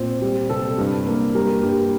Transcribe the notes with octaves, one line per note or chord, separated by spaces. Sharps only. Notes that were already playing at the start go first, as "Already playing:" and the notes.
Already playing: A#2 C4
G3
C3 A4
G2
A#3
G3 A#4
G2 G4